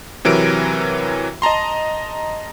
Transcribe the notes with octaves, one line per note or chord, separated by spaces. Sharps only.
C3 E3 F#3 A#4 D7
D#5 A5 A#5 C6